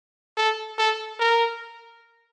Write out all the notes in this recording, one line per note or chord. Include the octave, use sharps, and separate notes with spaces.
A4
A4
A#4